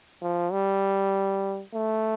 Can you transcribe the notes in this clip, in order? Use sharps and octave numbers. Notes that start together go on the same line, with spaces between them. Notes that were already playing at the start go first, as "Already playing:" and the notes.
F3
G3
A3